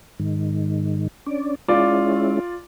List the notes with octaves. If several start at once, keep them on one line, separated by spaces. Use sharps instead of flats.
G#2 D#3
C#4 D4 D5
G#3 C#4 E4 F4 D5 D6